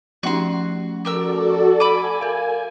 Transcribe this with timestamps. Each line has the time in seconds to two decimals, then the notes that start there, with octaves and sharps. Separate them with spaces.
0.23 F3 A3 C#4 F#4 C6
1.05 F#4 G4 A4 A#4 D5 E6
1.80 G#5 B5 D6 D#7
2.21 A#4 F5